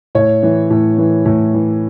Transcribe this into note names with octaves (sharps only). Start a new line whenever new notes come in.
A2 C#5
E3
A2
E3
A2
E3